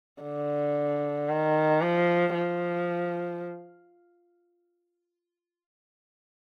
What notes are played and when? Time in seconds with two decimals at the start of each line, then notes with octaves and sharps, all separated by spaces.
0.23 D3
1.29 D#3
1.82 F3
2.35 F3